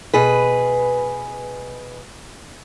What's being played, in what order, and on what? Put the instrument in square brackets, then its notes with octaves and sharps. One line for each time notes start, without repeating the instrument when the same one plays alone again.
[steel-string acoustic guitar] B2 G#4 B4